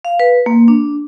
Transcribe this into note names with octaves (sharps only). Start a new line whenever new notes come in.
F5
B4
A#3
D4